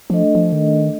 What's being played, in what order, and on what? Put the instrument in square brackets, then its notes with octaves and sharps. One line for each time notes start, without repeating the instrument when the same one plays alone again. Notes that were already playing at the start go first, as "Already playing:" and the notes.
[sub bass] F3 [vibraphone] A3 D4 A4 D#5
[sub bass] F3
D#3